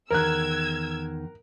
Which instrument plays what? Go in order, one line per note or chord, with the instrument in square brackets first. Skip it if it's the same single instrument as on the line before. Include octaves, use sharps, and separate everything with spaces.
[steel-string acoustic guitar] E2 D#3 [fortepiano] A#4 F#6 [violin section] E6 G#6